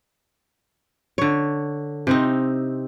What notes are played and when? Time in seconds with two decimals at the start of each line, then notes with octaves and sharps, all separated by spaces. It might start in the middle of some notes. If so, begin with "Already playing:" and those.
1.18 D3 C#5
2.07 C3 C4 D#4